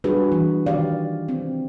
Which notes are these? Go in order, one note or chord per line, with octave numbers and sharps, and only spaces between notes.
G3 D4 F#4 G#4 B4
E3
D#3 G4 D5 F5
C4